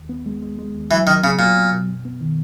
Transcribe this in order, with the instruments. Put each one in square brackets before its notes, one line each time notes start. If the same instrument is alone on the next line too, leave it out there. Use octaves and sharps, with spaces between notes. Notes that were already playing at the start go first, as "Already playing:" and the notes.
Already playing: [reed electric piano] D#2
B3
G#3
G#3
G#3
D#2
[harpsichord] E3 [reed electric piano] F#3
[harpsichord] D#3 [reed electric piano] F#3
[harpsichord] C#3 [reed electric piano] B3
[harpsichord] A#2 [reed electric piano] F#3
[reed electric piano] B3
B2
F#2
B3
D#3